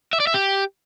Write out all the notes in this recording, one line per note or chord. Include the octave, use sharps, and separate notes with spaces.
E5
D5
E5
G4